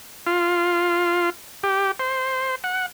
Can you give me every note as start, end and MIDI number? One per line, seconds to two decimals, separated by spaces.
0.27 1.30 65
1.63 1.91 67
1.99 2.55 72
2.64 2.86 78